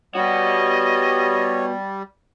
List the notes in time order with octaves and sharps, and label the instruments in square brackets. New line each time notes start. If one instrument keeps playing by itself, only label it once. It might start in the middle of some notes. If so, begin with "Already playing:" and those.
[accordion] G3 [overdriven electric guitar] B3 F#4 [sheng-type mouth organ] C#5 [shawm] D#5